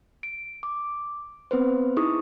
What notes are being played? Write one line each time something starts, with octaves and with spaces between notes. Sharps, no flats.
D7
D6
B3 C4 B4 C5
D#4 E4 G#4 C#6 D#6